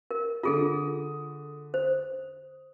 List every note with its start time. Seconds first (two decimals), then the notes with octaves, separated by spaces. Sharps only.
0.11 A#4
0.43 D3 F4 G#4 A4 D#6
1.74 C5